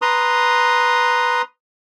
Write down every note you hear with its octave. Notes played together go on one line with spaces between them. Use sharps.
B4 A#5 C6 D#6